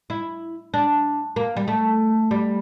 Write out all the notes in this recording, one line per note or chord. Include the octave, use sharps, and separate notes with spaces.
E4
D4
A#3
G3
A3
G3